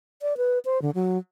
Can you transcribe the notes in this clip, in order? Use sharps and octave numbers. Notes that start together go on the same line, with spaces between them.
D5
B4
C5
D3
F#3